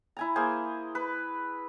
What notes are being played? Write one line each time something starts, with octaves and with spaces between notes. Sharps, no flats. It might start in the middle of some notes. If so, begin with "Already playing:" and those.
E4 G#5 A#5
A#3 G#4 C5 G#5
B4